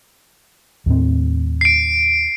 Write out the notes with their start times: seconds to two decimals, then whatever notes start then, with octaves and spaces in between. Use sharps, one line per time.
0.86 D#2 A2 C4
1.61 C7 D7